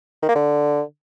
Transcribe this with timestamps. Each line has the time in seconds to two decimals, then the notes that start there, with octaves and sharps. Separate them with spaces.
0.23 D#3
0.29 A#3
0.35 D3